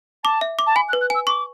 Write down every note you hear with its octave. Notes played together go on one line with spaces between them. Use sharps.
A5 D6
E5
D6
A5
G#5 B5
F#6
B4
F#6
G#5 E6
C#6 D6